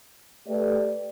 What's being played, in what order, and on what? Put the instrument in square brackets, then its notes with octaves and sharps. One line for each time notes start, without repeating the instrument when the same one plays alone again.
[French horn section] A3 G4 B4 D5